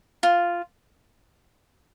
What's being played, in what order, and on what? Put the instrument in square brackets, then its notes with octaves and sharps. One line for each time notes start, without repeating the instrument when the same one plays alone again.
[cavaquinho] F4